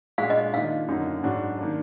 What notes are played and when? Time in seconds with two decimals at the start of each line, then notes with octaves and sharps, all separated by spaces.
0.18 A#2 G#3 D4 F#4 F5
0.30 D#5
0.54 D#3 A#3 D4 F4 F5
0.88 F#2 D3 F#3 A#3 D#4
1.24 G#2 F#3 D4 F#4
1.58 D#3 A#3 D4